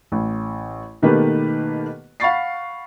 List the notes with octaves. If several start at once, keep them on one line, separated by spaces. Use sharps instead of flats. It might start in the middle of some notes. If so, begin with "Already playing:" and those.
A1
B2 D#3 A3 A#3 G4 B4
F5 F#5 B5 C#6 A6 C7